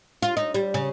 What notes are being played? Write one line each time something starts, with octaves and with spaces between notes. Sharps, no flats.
F4
D#4
G3
C#3